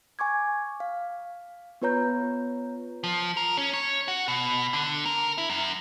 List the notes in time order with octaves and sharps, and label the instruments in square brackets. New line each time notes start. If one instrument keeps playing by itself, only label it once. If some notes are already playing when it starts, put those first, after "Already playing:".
[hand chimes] G#5 C#6 D6 G#6
F5
B3 F4 B4 C#5 A#5 G6
[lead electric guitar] F3
A#4
C#4
C#5
F#4
B2
D3
A#4
E4
F#2